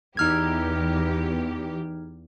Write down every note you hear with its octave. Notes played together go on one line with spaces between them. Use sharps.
E2 D#4 G4 F6 G#6